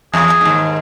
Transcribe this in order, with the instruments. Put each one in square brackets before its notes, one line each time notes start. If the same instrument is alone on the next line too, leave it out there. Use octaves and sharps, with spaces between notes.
[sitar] E2 [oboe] G#4
[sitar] D#2 G#2